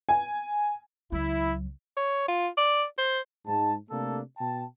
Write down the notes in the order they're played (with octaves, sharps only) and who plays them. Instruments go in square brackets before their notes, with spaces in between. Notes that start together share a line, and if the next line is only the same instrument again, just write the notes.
[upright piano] G#5
[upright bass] C#2 F#3 [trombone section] E4
[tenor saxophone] C#5
F4
D5
C5
[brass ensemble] G#2 A5
C3 A3 A#3 D4 A4
B2 G5 A5